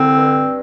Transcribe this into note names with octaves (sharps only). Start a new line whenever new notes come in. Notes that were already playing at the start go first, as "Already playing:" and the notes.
Already playing: C2 D3 C4
G2